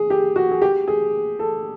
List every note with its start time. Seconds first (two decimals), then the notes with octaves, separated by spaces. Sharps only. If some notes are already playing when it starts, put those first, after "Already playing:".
Already playing: G#4
0.10 G4
0.36 F#4
0.51 G#4
0.62 G4
0.88 G#4
1.39 A4